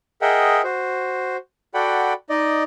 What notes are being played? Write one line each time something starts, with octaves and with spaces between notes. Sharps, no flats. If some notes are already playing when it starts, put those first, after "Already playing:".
G#4 A#4 D#5 E5 F#5 G5
F#4 C5
F#4 A4 D5 F#5 G5 B5
D#4 D5 D#5